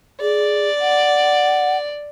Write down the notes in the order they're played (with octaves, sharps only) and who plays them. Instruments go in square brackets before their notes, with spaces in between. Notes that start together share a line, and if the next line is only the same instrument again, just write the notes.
[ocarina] G#4 [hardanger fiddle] D5
[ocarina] F#5